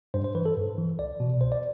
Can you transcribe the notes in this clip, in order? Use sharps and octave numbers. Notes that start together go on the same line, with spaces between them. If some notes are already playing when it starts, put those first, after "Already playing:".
G2 C5
C5
E3 B4
A4
G2
E3
C2 D5
B2
C2 C5
D5